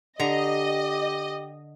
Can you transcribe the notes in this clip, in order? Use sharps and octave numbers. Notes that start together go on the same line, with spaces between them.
D3 G4 D#5 A#5